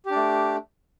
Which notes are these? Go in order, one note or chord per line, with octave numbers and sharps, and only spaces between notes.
A3 D4 G4